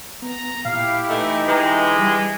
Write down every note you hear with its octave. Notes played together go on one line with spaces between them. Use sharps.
B3 A#5
A#2 E4 G4 F5
E3 A3 D#4
D3 E3 G#3 B4 G5 A#5
G3